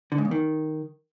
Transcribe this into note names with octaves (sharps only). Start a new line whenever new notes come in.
D3
G#2
E2
D#3